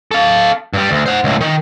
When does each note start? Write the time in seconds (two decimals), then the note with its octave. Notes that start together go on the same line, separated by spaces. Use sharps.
0.11 A4 F5
0.73 G2 G3
0.91 D2
1.06 C5 F#5
1.24 C#2 A2
1.41 D#3